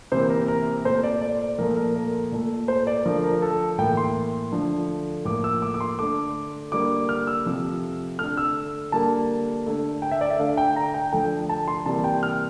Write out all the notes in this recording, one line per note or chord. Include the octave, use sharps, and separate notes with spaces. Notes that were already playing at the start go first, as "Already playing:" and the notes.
C3 E3 A#3 C5
A#4
A#4
A#2 A3 C5
D5
D5
A#2 F3 A3 A#4
A#4
A#4
A#2 A3
C5
D5
D3 F3 A3 A#4
A#4
A4
A2 E3 A#3 G5
C6
D3 F3 A3
A2 F3 A#3 D6
E6
D6
D6
C6
D3 A3 D6
D3 G3 A#3 D6
F6
E6
C3 F3 A3
D3 A3 F6
E6
D3 G3 A#3 A5
D3 A3
G5
E5
D5
E5
D3 A3 F5
G5
A#5
G5
D3 F3 A3 G5
A5
C6
C3 E3 G3 A#3 A5
G5
F6